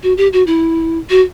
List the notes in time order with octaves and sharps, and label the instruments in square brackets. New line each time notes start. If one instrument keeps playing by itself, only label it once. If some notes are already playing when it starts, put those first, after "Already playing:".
[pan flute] F#4
G4
F#4
E4
F#4